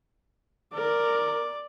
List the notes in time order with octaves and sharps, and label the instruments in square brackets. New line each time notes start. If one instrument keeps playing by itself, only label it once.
[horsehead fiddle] A#4 [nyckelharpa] D5 D6